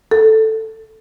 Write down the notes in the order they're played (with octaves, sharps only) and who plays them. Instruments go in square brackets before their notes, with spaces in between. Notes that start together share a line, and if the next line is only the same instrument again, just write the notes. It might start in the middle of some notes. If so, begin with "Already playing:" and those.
[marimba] A4